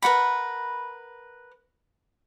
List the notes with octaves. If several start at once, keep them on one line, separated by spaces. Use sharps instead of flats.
A#4 B4 F#5 B5